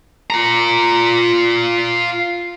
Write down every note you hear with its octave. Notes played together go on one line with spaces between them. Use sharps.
F4 A#5